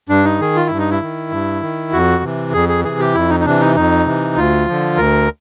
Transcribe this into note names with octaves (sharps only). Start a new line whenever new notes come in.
G2 D4
D#4
D#3 G#4
F4
G2 E4
D#4
E4
D#3
G2
D#3
F2 F#4
C3 E3
F2 G#4
G#4
C3 E3 G#4
G4
F2 E4
D#4
D#4
C3 E3 D4
D#4
F2 D#4
C3 E3
D2 F4
D3 F3
D2 A#4